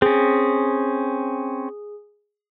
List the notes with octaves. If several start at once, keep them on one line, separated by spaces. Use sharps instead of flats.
C4 C#4 G#4